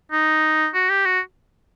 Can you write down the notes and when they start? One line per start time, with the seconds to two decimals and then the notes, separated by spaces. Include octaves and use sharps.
0.12 D#4
0.74 F#4
0.90 G4
1.06 F#4